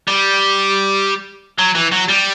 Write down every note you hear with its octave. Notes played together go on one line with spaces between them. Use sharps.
G3
F#3
E3
F#3
G3